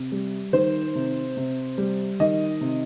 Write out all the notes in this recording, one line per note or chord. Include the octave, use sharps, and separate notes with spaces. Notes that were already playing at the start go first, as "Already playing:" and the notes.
Already playing: C3
G3
D#3 C5
C3
C3
G3
D#3 D#5
C3